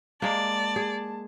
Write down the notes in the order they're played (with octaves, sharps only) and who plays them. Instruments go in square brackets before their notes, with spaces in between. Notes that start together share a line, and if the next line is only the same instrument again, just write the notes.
[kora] G#3 A#3 [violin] D5 [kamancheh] A5
[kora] G#4